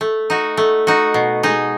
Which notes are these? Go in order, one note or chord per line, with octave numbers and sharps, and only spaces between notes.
A3
D#4 F#4
A3
D#4 F#4
B2
G#3 D#4